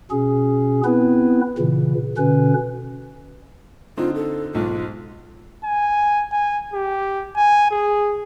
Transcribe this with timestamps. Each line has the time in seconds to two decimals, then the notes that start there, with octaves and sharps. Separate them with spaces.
0.11 B2 C#4 G#4
0.85 B3 C4 E4 B4
1.58 A#2 C#3 E3
2.18 B2 D3 C#4 B4
3.97 D3 C4 D#4 F4
4.15 A4
4.55 B1 G#2 F4
5.64 G#5
6.32 G#5
6.74 G4
7.37 G#5
7.71 G#4